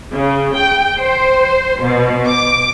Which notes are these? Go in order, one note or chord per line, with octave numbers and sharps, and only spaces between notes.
C#3
G5
C5
B2
D6